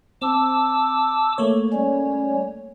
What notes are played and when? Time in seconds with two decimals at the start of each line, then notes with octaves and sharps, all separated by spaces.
0.22 C4 A5 D6 E6
1.38 A3 A#3 C#5
1.73 G3 C#4